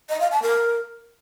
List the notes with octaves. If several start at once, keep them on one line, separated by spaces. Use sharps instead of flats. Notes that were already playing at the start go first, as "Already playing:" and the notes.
D#5
F5
A5
A#4